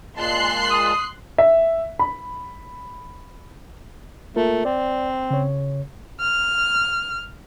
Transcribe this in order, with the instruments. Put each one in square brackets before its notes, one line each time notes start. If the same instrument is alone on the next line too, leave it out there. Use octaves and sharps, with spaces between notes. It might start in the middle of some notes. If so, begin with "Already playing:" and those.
[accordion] A#2 G#3 A5 [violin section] C6 F#6 C7
[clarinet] D#6
[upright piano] E5
B5
[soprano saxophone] A3 [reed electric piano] A#3 F4 A#4
[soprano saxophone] C4 [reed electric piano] D5
[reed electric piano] C#3 C#5
[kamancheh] F6